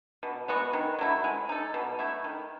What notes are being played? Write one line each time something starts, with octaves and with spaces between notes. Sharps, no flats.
B2
G#3 B3 F#4
D#3
F#3 A3 E4
G#3
D#4 A4
B2
A3 E4
D#3